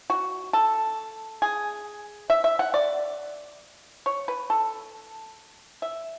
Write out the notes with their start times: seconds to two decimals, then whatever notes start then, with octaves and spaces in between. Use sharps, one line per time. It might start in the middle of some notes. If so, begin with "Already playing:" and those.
0.10 F#4
0.53 A4
1.42 G#4
2.30 E5
2.44 E5
2.59 F#5
2.74 D5
4.06 C#5
4.28 B4
4.50 A4
5.82 E5